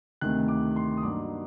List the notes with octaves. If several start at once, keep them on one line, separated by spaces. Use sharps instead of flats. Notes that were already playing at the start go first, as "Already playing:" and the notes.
D2 C3 D#3 F#6
D6
C6
D#6
G2 F#3 A#3 D#4 D6